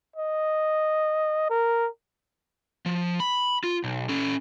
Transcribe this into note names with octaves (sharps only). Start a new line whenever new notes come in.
D#5
A#4
F3
B5
F4
B1
C#4 A4